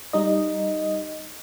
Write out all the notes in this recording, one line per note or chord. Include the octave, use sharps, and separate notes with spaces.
G3 D#4 D#5